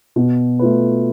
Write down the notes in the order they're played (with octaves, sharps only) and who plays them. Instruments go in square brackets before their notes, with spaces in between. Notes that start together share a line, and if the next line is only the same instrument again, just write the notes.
[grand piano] B2
A3 F4 B4